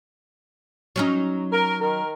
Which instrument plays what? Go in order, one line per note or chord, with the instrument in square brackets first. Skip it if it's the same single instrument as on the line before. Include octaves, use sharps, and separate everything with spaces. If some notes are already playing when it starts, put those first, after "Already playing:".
[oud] F#3 C#4 D#4
[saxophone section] A#4
D#3 A#4